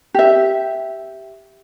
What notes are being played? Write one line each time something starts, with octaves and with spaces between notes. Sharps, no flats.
G4 E5